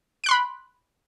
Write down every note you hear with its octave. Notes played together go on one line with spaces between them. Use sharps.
B5 C6 F#6 D7